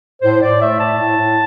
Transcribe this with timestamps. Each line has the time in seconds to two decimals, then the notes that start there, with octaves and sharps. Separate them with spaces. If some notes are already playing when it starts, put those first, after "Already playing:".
0.22 A2 C5
0.41 A2 D5
0.60 A3 E5
0.79 A2 A5
0.98 A2
1.17 A2